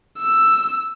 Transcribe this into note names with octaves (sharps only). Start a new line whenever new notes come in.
E6